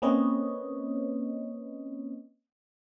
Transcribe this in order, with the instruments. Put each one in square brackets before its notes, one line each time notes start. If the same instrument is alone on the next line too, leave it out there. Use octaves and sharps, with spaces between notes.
[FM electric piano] A#3 C4 C#4 B4 C#5 D#5